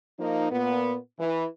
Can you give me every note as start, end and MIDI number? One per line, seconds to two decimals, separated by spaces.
0.19 0.50 53
0.19 0.50 58
0.19 0.50 63
0.51 0.96 46
0.51 0.96 59
1.19 1.46 52